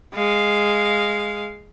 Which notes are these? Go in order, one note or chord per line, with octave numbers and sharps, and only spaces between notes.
G#3 F5